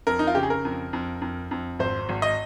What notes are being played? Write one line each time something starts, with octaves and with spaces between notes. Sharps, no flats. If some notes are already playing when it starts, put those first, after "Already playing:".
F2 A#4
D#4
F4
C#3 G4
G#4
A#4
F2
F2
F2
F2
G#1 C5
G#1
D#5